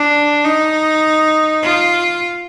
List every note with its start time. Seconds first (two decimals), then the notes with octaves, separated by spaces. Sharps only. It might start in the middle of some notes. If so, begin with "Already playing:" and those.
Already playing: D4
0.44 D#4
1.63 F4